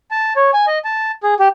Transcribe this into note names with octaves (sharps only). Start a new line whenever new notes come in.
A5
C#5
G#5
D#5
A5
G#4
G4